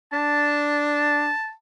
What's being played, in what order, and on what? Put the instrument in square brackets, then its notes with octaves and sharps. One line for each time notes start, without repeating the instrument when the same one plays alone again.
[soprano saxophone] D4 [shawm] A5